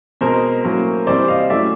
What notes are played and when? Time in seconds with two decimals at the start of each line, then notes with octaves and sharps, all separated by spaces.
0.21 B2 G#3 C4 A#4 C5
0.64 A2 F#3 A#3 C#4
1.07 C3 E3 G3 C4 C5 D5
1.28 D#5 F5
1.50 A2 F#3 A3 C#4 D5 E5